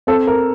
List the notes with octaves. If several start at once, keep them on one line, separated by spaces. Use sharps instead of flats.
C4 A4
A#4